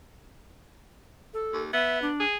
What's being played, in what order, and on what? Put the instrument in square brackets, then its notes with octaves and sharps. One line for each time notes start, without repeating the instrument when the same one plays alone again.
[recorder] A4
[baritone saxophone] D#2
[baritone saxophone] B3 [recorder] E5
[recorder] D4
[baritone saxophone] G#4